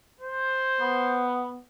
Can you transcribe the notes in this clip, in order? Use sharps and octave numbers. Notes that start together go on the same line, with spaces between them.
C5
B3